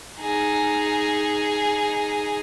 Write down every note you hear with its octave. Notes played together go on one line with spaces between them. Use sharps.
D#4 G#4